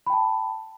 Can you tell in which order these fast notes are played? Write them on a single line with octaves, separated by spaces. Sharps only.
B5 G5 A5